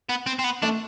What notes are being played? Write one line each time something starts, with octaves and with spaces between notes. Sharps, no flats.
B3
C4
C4
B3
A3 D4